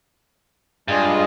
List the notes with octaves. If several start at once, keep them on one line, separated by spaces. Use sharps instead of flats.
G2 G#3 D4 F4 G#4 D#5